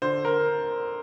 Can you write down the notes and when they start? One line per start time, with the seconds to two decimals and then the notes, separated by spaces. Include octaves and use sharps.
0.02 D3 C5
0.25 A#4